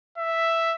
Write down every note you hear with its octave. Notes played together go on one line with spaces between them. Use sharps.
E5